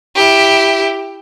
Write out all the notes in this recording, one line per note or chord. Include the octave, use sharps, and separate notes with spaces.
E4 G4